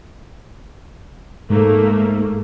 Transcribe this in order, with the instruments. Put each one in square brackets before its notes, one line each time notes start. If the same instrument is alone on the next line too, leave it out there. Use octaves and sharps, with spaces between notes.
[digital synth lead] G#2 [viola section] A3 A#3